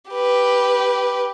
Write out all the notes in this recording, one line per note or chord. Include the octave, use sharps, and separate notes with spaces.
G4 B4